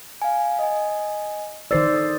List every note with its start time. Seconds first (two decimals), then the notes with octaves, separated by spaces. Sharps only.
0.22 F5 G#5
0.59 D#5 G#5
1.71 D#3 C5 D5 E6 A6 C7
1.94 A4 D#6 A6